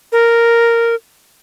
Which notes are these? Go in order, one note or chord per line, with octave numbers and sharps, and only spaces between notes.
A#4